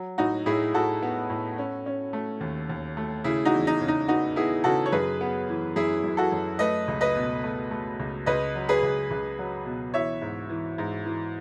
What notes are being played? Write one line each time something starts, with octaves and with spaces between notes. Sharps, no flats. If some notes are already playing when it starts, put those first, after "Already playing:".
Already playing: F#3
A2 D#4 F#4
A2 E4 G#4
A2 F#4 A4
B3
A2
C#4
C#4
A3
D#2
D#2
A3
C#3 E4 G#4
D#4 F#4
E2
D#4
C#3
D#4
B3 D#4 F#4
B3 E4 G#4
C#3 F#4 A4
C#5
F#2 G#4 B4
B3
E3
F#2 E4 G#4
F#2
F#4 A4
F#2
A3 B4 D#5
C#2
B4 D#5
B2
A3
A3
C#2
C#2 B4 D#5
F#3
G#4 B4
C#2
C#2
F#3
B2
E3 C#5 E5
G#2
E3
G#2
E3